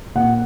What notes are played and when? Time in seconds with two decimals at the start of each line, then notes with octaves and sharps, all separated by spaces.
0.15 A#2 F#5